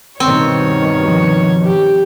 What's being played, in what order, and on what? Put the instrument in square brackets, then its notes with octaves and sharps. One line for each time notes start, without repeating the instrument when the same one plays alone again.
[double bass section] G2 B2 D#3 [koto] C4 [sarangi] C#5
[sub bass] F3
[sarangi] G4